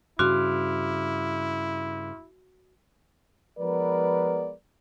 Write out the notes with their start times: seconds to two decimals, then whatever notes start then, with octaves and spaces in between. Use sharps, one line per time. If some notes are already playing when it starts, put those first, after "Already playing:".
0.19 G2 C#3 E4 F#4 C6 D6 F6
3.58 F3 G#3 B3 A#4 B4 D5